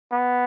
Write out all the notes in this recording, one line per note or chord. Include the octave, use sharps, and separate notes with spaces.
B3